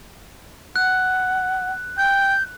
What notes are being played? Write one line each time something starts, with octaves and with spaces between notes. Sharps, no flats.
F#5 F#6
G5 G6